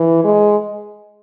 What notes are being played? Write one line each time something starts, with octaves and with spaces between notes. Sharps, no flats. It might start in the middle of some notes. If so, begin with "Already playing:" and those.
Already playing: E3
G#3